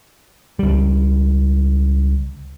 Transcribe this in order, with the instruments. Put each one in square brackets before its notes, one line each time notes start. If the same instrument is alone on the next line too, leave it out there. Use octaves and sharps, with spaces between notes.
[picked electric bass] C#2 G3